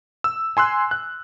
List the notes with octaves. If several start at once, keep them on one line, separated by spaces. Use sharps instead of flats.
E6
G#5 C6 E6 F#6
F#6